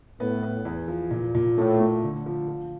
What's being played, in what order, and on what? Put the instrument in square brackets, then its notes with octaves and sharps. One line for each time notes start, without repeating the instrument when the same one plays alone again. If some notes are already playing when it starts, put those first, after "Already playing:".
[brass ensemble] A2 [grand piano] B3
[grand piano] B3
E2
F3
A#2
A#2
[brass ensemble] A2 [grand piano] A3
[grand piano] A3
D3
F3
F3